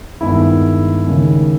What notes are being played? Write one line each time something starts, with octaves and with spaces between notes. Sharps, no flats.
G2 D#3 G#3 B3 E4
D#2 C#3 G#3